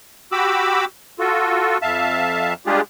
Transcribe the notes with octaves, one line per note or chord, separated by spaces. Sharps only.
F#4 G4 B5 D6 E6
F4 F#4 A4
F2 E5 F5 A5
G3 G#3 D4 F4 G4 G#4